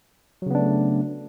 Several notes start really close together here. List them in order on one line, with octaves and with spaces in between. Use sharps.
F#3 C#3 B3 D4 A3